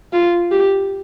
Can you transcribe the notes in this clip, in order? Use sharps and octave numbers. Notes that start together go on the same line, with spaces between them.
F4
G4